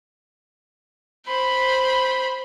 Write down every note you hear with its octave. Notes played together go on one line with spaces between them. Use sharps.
C5 B5